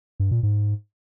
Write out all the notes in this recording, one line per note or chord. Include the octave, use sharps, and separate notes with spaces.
G2
A#2
G#2